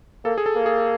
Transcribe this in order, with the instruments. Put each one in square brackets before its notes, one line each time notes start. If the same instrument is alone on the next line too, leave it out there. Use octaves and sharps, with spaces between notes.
[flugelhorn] A#3 [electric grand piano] A4
[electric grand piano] G#4
A4
[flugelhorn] A#3
[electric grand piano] G#4